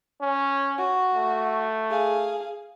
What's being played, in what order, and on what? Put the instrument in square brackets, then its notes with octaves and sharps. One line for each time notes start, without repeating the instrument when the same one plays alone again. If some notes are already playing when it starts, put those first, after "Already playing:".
[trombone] C#4
[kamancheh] F#4
[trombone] A3
[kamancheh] G#4 F5